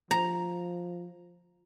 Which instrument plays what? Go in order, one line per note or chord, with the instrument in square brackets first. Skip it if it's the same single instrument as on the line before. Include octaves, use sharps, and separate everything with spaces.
[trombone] F3 [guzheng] A#5